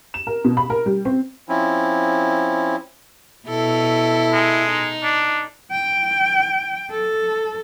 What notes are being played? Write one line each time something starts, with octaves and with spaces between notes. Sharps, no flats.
E7
A#4
B2
B5
A#4
G3
C4
F3 C4 C#4 E4
B2 E4 A4
G#3
D#4
D4
G5
A4